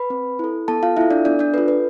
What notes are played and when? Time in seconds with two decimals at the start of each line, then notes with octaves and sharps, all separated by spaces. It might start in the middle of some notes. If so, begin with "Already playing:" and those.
Already playing: B4 B5
0.10 C4
0.39 E4 A4
0.68 B3 A4 A5
0.83 F4 F5
0.96 E4 F4 A4 E5
1.11 D4 D5
1.25 B3 D4 D5
1.39 D4 D5
1.54 F4 A4 B4
1.68 B4